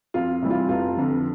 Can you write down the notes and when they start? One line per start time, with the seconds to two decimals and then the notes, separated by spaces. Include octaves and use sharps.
0.14 F2 F4
0.42 C3 E3 G3
0.50 F4
0.69 F1 F4
0.97 F2 D3 F3